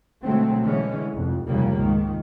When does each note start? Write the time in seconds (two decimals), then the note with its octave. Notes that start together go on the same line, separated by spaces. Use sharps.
0.23 B2 D3 F#3 G#3 A3 C4
0.62 D3 E3 G#3 C#4
1.14 F1 F2
1.46 F1 D#2 C#3 G3 A#3
1.77 C#2 G#2 D#3